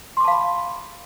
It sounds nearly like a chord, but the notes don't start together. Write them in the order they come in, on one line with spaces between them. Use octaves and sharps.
C6 D6 A5 F5 B5